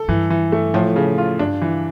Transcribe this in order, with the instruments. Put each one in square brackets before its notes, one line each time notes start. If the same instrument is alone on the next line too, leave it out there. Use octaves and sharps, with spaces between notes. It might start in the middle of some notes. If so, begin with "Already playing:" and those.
Already playing: [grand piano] A4
[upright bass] G2 [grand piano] E3
[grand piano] E3
A3
[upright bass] A2 [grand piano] F3
[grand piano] C#3
F4
[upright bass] G2 [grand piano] D4
[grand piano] E3